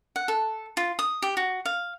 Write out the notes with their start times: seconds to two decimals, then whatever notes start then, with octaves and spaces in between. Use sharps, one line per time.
0.16 F#5
0.28 A4
0.77 F4
0.99 D#6
1.22 G4
1.37 F#4
1.65 F5